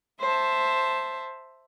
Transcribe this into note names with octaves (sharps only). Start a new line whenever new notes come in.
C5 E5 A5